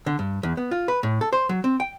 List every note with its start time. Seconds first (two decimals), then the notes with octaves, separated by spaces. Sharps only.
0.06 D3
0.19 G2
0.43 E2
0.57 B3
0.71 F4
0.88 B4
1.03 A2
1.21 A4
1.33 C5
1.49 F#3
1.64 C4
1.80 G5